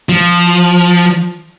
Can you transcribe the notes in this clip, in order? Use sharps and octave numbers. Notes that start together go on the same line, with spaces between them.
F3